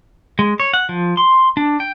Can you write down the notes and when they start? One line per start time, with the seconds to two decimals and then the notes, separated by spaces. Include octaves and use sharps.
0.39 G#3
0.60 C#5
0.74 F#5
0.89 F3
1.17 C6
1.57 D4
1.80 G5